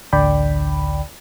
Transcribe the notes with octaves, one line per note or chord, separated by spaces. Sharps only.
A1 D2 D3 D5 G5 B5